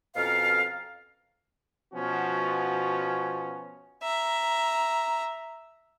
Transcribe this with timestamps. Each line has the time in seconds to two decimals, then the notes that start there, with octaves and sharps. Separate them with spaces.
0.15 F2 B2 C#4 A4 A#4 F5
1.93 B2 F3 B3 C#4 F#4
4.03 E5 A#5